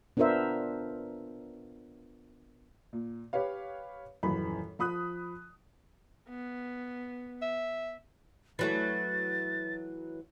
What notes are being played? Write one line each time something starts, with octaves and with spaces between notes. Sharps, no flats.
B3 D4 F4 A#4 C5 E5
A#2
G4 B4 C#5 F5
D#1 F#2 E3 B5
F3 B5 D#6 F#6
B3
E5
E3 F#3 A3 A6